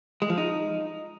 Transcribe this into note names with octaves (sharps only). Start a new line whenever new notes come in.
G#3
F3
D#4